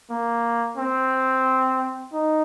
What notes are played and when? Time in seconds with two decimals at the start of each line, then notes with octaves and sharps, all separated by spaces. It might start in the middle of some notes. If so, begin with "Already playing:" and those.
0.10 A#3
0.77 C4
2.13 D#4